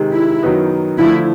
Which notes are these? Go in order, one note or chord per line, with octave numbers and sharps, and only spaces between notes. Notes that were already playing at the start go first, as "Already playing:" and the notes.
Already playing: C3 D#3 G#3
E4
F#2 D#3 F#3 B3 D#4
D3 F3 A3 E4